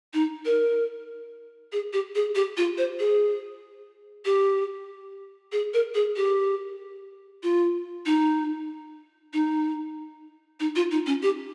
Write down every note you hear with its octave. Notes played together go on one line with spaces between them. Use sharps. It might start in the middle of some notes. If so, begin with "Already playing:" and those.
D#4
A#4
G#4
G4
G#4
G4
F4
C5
G#4
G4
G#4
A#4
G#4
G4
F4
D#4
D#4
D#4
F4
D#4
C#4
G4